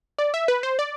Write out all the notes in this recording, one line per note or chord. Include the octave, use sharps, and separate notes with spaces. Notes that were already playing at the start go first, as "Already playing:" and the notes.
D5
E5
B4
C5
D5